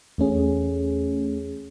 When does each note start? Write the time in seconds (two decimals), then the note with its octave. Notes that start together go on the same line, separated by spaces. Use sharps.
0.18 E2 A3 C#4 G#4